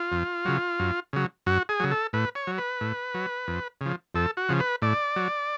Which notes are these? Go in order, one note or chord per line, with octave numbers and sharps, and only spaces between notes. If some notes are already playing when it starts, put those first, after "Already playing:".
Already playing: F4
F2
C#3 F#3
F#2
C#3 F#3
F#2 F#4
G#4
C#3 F#3
A4
A2 B4
C#5
F#3
B4
A2
F#3
F2
C#3 F3
F2 A4
F#4
C#3 F3
B4
A2 D5
F#3